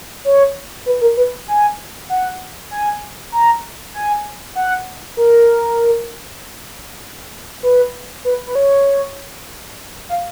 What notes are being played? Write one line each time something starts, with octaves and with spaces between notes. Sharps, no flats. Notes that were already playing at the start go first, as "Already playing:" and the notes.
C#5
B4
A#4
B4
G#5
F#5
G#5
A#5
G#5
F#5
A#4
B4
B4
B4
C#5
F5